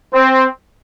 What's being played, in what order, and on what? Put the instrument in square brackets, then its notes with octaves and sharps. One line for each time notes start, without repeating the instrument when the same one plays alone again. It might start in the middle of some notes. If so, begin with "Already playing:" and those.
[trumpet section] C4